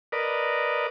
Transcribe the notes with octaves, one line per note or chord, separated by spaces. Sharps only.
A#4 B4 D5 D#5